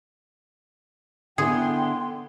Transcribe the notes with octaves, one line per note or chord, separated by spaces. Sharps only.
D3 B3 E4 G#4 G5 C6